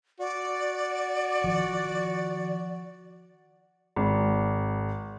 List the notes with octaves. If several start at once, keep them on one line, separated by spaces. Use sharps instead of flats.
F#4 D5
D#3 F3
G#1